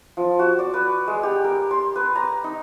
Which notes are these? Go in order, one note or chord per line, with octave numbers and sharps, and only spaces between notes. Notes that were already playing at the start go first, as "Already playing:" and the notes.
F3
F#4
D5
B4
G#3
G4
A#4
C6
B4
A#5
D#4